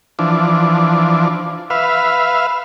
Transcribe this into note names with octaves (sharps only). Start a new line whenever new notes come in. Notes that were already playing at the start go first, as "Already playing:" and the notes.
E3 F3 D4
B4 E5 F5